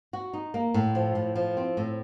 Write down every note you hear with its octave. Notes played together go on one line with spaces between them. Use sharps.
F#4
D#4
A#3
A2
F3
A2
F3
C4
A2